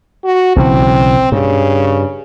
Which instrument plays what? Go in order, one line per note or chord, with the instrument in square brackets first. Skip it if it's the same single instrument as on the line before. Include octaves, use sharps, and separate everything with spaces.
[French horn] F#4
[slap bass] B1 C#3 E3 [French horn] C4
[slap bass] G2 [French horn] C#3